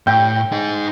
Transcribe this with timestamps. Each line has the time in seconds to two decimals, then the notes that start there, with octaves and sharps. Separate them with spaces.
0.07 A2 G5
0.52 D#4 G#4